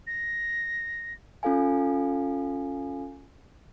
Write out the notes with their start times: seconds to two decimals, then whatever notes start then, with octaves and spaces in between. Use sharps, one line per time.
0.07 A#6
1.43 C#4 F4 A4 F5 G#5